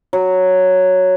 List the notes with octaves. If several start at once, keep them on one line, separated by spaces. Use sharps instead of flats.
F#3